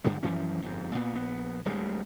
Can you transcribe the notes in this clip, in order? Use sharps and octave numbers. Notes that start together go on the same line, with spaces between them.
G2 D3 G3 G#3
F#2 E3 F3 C#4
G1 F2 G#2
A#2 B3
A#1 B3
D1 D2 G3 G#3